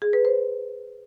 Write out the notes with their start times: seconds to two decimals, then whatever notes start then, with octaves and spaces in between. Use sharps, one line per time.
0.02 G#4
0.13 B4
0.25 C5